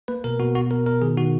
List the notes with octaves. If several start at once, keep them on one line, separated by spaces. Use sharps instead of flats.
A#3 B4
B2 A#4
B2 F#4
B2 F#4
B2 A#4
B2 A#4
D#3 G#4
D#3 F#4